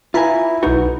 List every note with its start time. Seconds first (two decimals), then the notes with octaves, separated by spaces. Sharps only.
0.14 E4 F4 B4 E5 G#5 A#5 B5
0.63 B1 D#4 F#4 B4